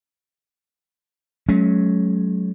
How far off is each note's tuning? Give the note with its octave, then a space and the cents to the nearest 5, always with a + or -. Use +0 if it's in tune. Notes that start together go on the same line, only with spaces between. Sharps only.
F#3 +0 A3 -45 C#4 +0